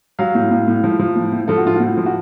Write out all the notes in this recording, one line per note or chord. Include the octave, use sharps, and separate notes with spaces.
F#3 F5
A2
A2
A2
F3
F3
A2
A2
F3 A4
F#4
A2 F4
A2 F#4
F3
F#4